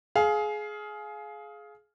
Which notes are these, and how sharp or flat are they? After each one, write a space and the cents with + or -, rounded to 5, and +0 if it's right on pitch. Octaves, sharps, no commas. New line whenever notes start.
G#4 +20 F5 +0